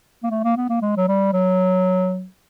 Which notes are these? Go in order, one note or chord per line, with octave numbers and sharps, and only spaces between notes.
A#3
A3
A#3
B3
A#3
G#3
F#3
G3
F#3